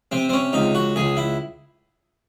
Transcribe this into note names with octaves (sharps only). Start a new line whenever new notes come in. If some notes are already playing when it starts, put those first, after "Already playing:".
C3 C4
C4
C#4
C#2 D#4
F#4
C#2 G#4
E4